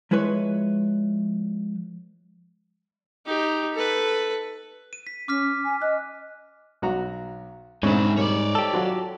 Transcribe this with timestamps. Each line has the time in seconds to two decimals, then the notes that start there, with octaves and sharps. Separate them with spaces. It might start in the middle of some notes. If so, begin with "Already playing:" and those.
0.11 F3 G#3 E4 B4 C#5
3.26 D#4 G4
3.74 A4 B4
4.93 D#7
5.07 B6
5.28 C#4 D6 F6 B6
5.65 G#5
5.82 D#5 F#6
6.82 B1 F#4 A#5
7.83 D2 G#2 G#3 C4 E4 C#5
8.18 G3 A#4 C#5 D5
8.55 G4 A4
8.73 F#3 F4 F#4